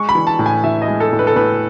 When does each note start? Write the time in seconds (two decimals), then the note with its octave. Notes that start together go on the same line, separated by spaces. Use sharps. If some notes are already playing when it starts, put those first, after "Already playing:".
Already playing: G#3 C#6
0.09 B5
0.15 E3
0.27 A5
0.39 A2
0.46 G#5
0.64 E3 E5
0.82 D#5
0.88 G#3
1.00 A4
1.13 A2
1.19 B4
1.27 A4
1.36 A2 B4